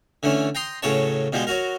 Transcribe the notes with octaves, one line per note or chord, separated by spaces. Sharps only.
D3 E3 A3 C#4
G5 A#5 C6 D#6
A2 C#3 F#3 B4 C#5 A5
B2 F3 G3 G#3 B3
F#3 F#4 A#4